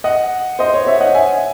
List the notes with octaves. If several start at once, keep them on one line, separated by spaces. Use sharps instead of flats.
D#5 F#5
C5 D#5
C#5
C#5 E5
D#5 F#5
E5 G#5